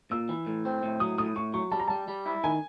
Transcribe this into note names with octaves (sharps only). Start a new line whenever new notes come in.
A#2 E6
E3
A2
C4
A2
F#3 D#6
A2 D#6
A2 C#6
F#3 C#6
G3 A5
A#5
G3 A5
G3
E4
D#3 G#5